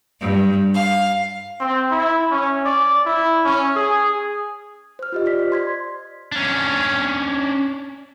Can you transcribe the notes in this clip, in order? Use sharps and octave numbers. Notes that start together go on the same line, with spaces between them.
G2
F5
C4
E4
C#4
D5
E4
C#4
G#4
C5 F6
F4 G4 D#5
D5 B6
C5
C6 G#6 B6
C#4 D4